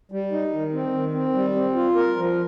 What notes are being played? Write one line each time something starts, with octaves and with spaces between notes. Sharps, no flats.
G3
D#4
D#3
C4
D#3
C4
G3
C4
F4
A#4
F3